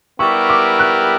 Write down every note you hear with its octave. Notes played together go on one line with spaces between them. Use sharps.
G3 B3 E4 G4 A#4 C#6
D6
F#6